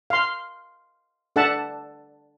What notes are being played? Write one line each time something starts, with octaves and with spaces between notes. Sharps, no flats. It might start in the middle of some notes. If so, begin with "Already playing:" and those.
F5 C6
D4 A4 E5 F#5 A5